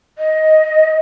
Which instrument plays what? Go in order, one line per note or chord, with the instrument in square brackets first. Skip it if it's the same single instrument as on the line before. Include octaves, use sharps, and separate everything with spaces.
[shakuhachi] D#5